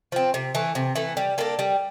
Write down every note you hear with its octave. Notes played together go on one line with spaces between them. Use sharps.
F3 C4
C3
E3 A3
C3
E3 A3
G3
A#3 D4 A4
G3